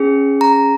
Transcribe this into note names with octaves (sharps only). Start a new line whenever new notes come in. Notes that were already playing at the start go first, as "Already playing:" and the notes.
Already playing: C#4 G#4
A#5